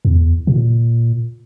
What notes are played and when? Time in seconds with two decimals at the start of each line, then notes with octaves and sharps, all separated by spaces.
0.05 E2
0.47 A#2